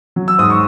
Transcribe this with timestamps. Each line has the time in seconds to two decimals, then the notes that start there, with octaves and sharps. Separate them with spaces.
0.16 F#3
0.28 E6
0.38 G#2 D#6
0.50 C#6